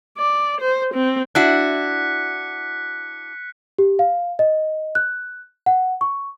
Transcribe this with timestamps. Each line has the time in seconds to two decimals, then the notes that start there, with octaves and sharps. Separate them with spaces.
0.18 D5
0.61 C5
0.94 C4
1.35 D4 E4 F#4 F#6 B6 C#7
3.78 G4
3.99 F5
4.39 D#5
4.95 F#6
5.66 F#5
6.01 C#6